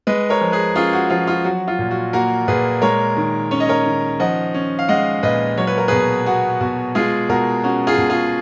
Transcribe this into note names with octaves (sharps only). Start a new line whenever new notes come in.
G#3 B4 D#5
A#4 C#5
F3
G#4 B4
C#4 F4 G#4
F#4
F3 F4
F4
F#3 F#4
F4
A#2
F#4
A#3 F#4 A#4
A#2 G#4 B4
G#3 A#4 C#5
D#3
C#4 C#5
D#5
A#4 C#5
D#3
F3 D#5 F#5
C#4
F5
G#3 D#5 F#5
A#2 B4 D#5
F#3 C#5
B4
A#4
B2 G#4 B4
B3 F#4
B2 F#4
G#3 F4 G#4
B2 F#4 A#4
C#4 F#4
F4 G#4
B2
F4 G#4